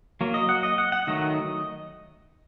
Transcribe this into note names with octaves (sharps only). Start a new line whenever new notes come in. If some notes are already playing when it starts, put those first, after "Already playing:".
F#3 A#3
D#5
F#5
D#5
F#5
F#5
D#3 F#3 A3 D#5